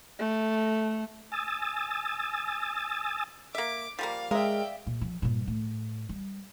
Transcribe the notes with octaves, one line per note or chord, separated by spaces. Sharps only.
A3
G#5 D#6 E6 A6
A#3 E5 D6
F3 G3 A#3 F5
G#3 A#4 D5 E5 F5 G5
A#2
F3
G2 A#2
A2
G3